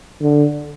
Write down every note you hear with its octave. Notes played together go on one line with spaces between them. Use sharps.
D3